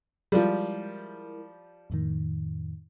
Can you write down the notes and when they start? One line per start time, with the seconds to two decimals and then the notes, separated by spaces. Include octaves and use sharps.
0.32 F3 G3 G#3 E4 A#4
1.90 F2 A2 D#3